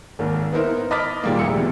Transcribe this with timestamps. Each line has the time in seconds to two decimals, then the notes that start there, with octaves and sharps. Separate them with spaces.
0.19 G#1 D#2
0.53 B3 D#4 E4 A#4 C5
0.91 D#5 B5 D6 F6 A6 B6
1.23 A#2 D#3 G3 G#3 A#3
1.39 F1 D2 G#4 E6 C#7
1.57 F2 B2